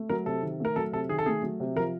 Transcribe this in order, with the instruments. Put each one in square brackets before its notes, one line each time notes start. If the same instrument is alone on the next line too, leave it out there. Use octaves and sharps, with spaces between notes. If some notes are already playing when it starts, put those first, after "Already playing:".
Already playing: [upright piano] A3
[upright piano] F#3 [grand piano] A#4
[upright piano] C3 [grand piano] A4
[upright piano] D#3
[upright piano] A3 [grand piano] A#4
[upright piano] F#3 [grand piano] A4
[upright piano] C3 [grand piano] A4
[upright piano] D#3 [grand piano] G#4
[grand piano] A4
[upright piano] A3 [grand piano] G#4
[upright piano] F#3
C3
[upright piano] F3 [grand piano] A#4